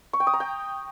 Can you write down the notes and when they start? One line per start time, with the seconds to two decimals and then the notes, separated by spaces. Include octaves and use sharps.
0.13 C#6
0.20 G5
0.27 D#6
0.33 A#5
0.40 G5